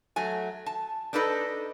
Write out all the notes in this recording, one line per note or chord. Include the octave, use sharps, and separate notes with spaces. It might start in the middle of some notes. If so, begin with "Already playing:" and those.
F#3 A3 G#5
A5
D4 D#4 A4 B4 D#5